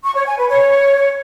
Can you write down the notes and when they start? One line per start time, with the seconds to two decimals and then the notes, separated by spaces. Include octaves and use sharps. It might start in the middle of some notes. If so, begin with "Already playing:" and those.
0.04 C#6
0.15 C#5
0.26 G#5
0.38 B4
0.49 C#5